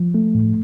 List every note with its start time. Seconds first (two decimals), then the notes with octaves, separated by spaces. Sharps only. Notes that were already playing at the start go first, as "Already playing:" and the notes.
Already playing: F3
0.15 A3
0.35 A2